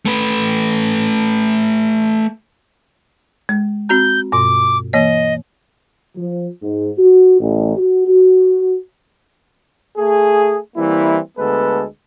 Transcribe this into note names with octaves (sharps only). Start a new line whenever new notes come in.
A3 B4
G#3
C4 F#4 A#5 G6
G2 B2 D6
E3 A#3 C#5 D#5
F3
G#2
F#4
A1
F#4
F#4
A3 G#4
E3 G3 A#3 C4 E4
D2 G#3 B3 A4 B4